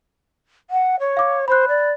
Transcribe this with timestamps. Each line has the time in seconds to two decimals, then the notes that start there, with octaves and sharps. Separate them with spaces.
0.70 F#5
1.00 C#5
1.17 F5 D6
1.48 C5 B5 F#6
1.68 D5